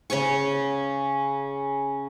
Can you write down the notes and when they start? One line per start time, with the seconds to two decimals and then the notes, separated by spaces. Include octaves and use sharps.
0.10 C#3 C#5 G#5 C#6